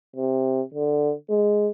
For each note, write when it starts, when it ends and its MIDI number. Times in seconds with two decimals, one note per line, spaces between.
0.16 0.62 48
0.74 1.13 50
1.30 1.70 56